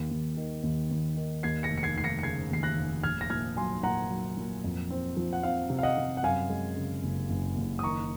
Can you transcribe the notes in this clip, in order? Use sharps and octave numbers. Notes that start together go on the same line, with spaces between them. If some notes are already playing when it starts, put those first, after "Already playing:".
Already playing: D#2
D#2
D#3
D#2
D#2
D#3
D#2 G#6 C7
A#6 C#7
F1
C#7
G#6 C7
F1 C7
A#6 C#7
C#7
C#3 G#6 C7
D#2 C7
F#6 A#6
F1
A#1 F6 G#6
A#6
A#2 F6 G#6
F#3 G#5 C6
A#2 F#5 A#5
F#3
A#2
F2
C4
F3
F#5
C4 F5
C3
F5
D#5 F#5
C3
F#5
F#2 F5 G#5
G#3
C#3
F#1
F#1
F#1
D#6
D#3 A#5 C#6